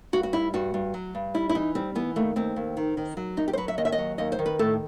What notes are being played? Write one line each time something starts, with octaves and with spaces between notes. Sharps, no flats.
G2 F#4
F#4
G3 E4
G2 F#4
G2
F#3
G2
G3 E4
E4
E3 D#4
G3 C4
E3 B3
D#2 A3
D#2 C4
D#2
D#3
D#3
F#3
F#2 D#4
G4
C5
F#3 B4
E5
D#2 D#5
E5
D#5
F#3
D#2 D#5
C5
D#3
B4
A2 A4